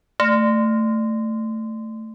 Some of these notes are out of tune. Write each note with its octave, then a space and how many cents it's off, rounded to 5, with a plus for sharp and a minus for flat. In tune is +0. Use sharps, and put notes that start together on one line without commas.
A3 +10